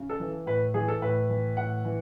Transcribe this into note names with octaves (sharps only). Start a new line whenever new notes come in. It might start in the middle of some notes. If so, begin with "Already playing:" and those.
Already playing: C#3
A4
E3
A2 B4
E3 G#4
A4
A2 B4
E3
A2 F#5
E3